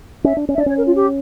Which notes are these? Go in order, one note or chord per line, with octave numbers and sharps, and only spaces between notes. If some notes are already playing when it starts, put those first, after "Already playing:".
C#4 E5
D4
C#4
E5
D4 D5
C#4 C#5
A#4
F4
G4